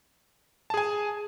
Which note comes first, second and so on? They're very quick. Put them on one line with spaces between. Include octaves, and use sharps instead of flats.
A5 G#4 G#5